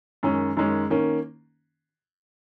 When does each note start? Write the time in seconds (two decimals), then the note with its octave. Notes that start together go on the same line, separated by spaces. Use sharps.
0.23 F#2 D#3 G#3 C#4
0.57 F#2 D#3 G#3 C#4
0.90 D#3 A#3 C#4